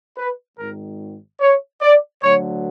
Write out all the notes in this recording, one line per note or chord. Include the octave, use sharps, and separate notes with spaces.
B4
G#1 G#2 D#3 A#4
C#5
D5
D2 D3 F#3 C#5